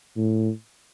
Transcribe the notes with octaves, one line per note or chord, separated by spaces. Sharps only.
A2